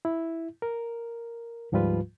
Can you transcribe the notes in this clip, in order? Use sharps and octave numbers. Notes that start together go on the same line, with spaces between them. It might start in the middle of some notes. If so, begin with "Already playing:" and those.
E4
A#4
D2 G#2 F3 G3 F4 B4